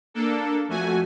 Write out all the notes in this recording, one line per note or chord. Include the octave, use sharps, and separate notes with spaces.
A#3 D4 A4
F2 A3 F#4 G#5